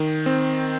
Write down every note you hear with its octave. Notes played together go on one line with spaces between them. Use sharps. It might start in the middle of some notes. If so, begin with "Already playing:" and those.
Already playing: D#3
C4